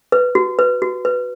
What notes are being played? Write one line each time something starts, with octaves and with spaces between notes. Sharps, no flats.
B4
F#4
B4
F#4
B4